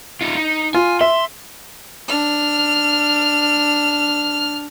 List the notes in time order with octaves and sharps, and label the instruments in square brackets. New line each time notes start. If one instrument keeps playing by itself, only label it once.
[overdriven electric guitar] D#4 F4
D#4
[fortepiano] F4 [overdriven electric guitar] G#5
[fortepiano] E5 [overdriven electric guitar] C6
[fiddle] D4 F6